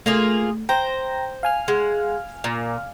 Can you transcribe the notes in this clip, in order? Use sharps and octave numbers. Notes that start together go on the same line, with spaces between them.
A3 A#3 F4 G#4
C5 G5 A#5 A#6
F5 G#5 F6
G#3 F#5
A#2